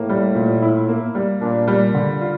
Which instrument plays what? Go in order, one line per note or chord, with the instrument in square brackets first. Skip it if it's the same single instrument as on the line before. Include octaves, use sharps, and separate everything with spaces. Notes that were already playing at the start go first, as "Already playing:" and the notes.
Already playing: [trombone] A2 [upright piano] A#3
[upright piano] G3
A#2
E4
A#3
G3
[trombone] A#2 [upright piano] D4
[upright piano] G3
D3
F4